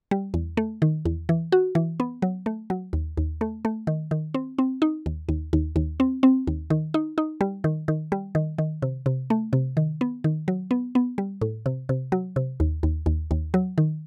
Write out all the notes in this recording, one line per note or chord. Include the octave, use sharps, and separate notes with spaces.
G3
E2
A3
D#3
E2
E3
F#4
E3
B3
F#3
A3
F#3
D#2
D#2
A3
A3
D#3
D#3
C4
C4
D#4
D#2
D#2
D#2
D#2
C4
C4
D#2
D#3
D#4
D#4
G3
D#3
D#3
G3
D#3
D#3
C3
C3
A3
C3
D#3
B3
D#3
F#3
B3
B3
G3
A2
C3
C3
F#3
C3
D#2
D#2
D#2
D#2
F#3
D#3